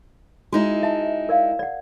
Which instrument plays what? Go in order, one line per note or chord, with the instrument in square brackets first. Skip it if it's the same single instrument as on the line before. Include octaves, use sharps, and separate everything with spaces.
[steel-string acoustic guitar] G#3 D#4 E4 [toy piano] F#4
[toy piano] E5 A5
A#4 D5 F5
D5 F#5